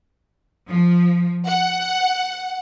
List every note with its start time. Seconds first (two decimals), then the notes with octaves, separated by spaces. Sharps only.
0.71 F3
1.46 F#5